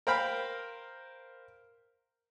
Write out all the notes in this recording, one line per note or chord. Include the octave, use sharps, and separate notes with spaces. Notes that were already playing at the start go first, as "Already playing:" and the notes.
A#4 C5 F5 G5 B5